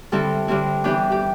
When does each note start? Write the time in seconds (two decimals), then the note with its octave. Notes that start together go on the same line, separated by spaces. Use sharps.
0.12 D3 G3 C4 E4 A4
0.48 D3 G3 C4 E4
0.84 E3 B3 D4 G4
1.12 G4